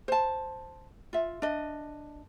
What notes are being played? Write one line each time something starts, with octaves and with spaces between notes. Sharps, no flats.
C5 A5
F4 E5
D4 D#5